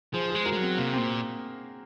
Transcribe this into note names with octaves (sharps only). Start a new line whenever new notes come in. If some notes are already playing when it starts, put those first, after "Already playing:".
F3 G#4 C5
G#3 G#4 C5
F#4 A#4
G#3
F#3
C4
C3 A#3
A#2 C4